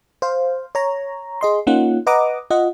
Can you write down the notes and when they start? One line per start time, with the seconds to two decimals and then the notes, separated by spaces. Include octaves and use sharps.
0.22 C5 F5
0.75 C#5 A#5
1.41 G#4 D#5 C6
1.67 A#3 C#4 D#4 F4 F#5
2.07 B4 D#5 F#5 A#5 D6 D#6
2.51 F4 D#5 F#5